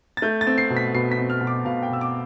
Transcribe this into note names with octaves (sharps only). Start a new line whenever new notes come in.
A6
A3 G6
A6
C4
C7
B2
B6
B2 C7
B6
C4
F6
B2
D6
B2 F5
G5
B2 E6
D6